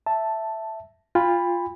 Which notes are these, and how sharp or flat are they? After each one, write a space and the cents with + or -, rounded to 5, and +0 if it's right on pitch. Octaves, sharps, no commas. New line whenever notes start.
E5 +0 A5 +0
F4 +0 G5 +40 B5 +0